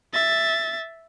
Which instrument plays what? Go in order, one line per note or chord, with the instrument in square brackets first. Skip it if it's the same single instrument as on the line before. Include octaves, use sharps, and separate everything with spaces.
[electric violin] E5 A6